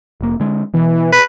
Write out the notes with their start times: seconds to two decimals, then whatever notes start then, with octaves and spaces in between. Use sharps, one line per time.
0.21 F1 A#3
0.40 D3 G#3
0.74 B2 E3
1.13 B4